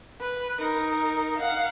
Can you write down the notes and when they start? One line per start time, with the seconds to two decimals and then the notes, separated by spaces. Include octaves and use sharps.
0.20 B4
0.59 D#4 A#4
1.37 F5 F#5